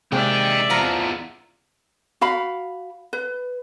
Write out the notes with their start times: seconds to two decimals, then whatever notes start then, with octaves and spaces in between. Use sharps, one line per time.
0.12 C3 G#3 A#3 D#4 D5 E5 G5
0.70 E2 F3 F5 A#5
2.21 F#4 F5 B5
3.13 B4